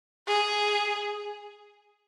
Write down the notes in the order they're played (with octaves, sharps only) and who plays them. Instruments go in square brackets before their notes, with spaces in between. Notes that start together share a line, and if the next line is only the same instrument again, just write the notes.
[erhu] G#4